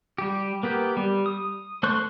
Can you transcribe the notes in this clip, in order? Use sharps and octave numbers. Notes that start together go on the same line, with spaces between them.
G3 G4
A#3 B3 G4
G3
D#6
A3 C5 C6 C#6 F#6